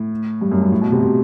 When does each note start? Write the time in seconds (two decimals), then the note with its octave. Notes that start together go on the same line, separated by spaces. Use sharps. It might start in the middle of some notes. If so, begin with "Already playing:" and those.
Already playing: A2
0.41 G2
0.51 F#2
0.61 G2
0.72 A2
0.81 B2
0.92 C3
1.02 C3